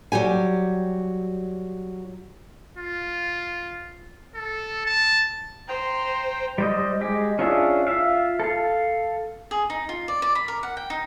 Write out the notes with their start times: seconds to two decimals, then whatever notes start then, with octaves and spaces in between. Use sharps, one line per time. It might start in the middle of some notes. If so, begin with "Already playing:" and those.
0.12 F#3 G3 G4 G#5
2.77 F4
4.35 A4
4.85 A5
5.68 C5 G5 A#5
6.58 G3 C5 D#5
7.01 G#3 G4
7.39 C#4 D4 F4 G#4 E5
7.87 F4 E5 F5
8.40 A4 F5
9.51 G#4
9.70 D#4
9.89 F4
10.08 D5
10.22 D5
10.35 B5
10.48 A#4
10.63 F#5
10.77 G5
10.90 D#4